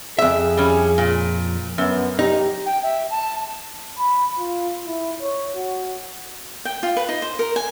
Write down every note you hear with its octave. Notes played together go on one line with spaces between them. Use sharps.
F2 G#4 E5
G3 C#4
A#2
F#2 B3
D#4 G4
G5
E5
A5
B5
F4
E4
C#5
F#4
G5
F4
B4
D#4
C5
A#4
G#5